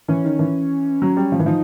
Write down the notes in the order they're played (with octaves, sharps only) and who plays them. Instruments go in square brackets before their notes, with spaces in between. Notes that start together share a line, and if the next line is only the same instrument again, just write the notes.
[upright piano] E3 [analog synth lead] C#4
[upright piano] D#3
E3
F#3
G3
F3
E3
[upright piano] F3 [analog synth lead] D#4